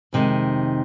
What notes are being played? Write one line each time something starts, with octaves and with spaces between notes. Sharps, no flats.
F2 C3 D#3 G#3